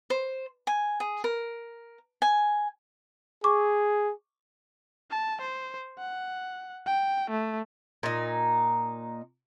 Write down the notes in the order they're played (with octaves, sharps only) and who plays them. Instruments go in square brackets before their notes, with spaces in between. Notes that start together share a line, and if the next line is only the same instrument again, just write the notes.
[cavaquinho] C5
G#5
G#4
A#4
G#5
[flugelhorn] G#4 [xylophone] C#6 D6
[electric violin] A5
C5
F#5
G5
A3
[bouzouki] A#2 D#4